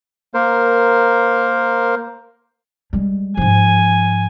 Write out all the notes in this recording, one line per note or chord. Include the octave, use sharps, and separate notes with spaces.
A#3 A#4 C5
G3 G#3
G#2 F3 G#5